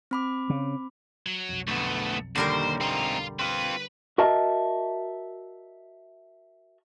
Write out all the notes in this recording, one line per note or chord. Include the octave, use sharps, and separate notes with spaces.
C4 B5 D6
C#3
F#3
B1 F2
D2 A3 B3 A4
D#2 D3 G3 A#4 C5
C4 D#4 F5 C6
C4 F4 B4
F#4 A#4 D#5 E5 A5